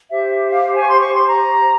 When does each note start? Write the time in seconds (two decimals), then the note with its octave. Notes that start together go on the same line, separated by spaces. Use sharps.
0.11 G4 C5 E5
0.49 F5
0.75 G#5
0.83 C#6
0.88 C6
1.01 C#6
1.14 C6
1.26 A#5